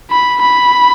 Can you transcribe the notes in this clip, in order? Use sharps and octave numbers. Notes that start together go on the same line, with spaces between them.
B5
B5